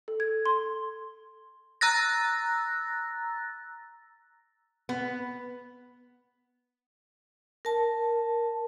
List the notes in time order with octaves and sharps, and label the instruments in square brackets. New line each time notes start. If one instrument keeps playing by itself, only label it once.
[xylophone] A4
G#6
C6
[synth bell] A#5 E6 F#6 A6 A#6
[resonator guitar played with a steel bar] B3
[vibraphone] A#4 A5